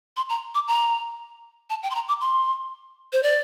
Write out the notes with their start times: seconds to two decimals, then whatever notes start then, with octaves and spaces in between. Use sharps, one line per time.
0.17 C6
0.29 A#5
0.55 D6
0.68 A#5
1.70 A5
1.83 G5
1.91 C6
1.95 A#5
2.08 D6
2.21 C6
3.13 C5
3.23 D5